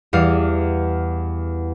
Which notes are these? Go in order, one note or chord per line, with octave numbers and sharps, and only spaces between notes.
E2 G3 F5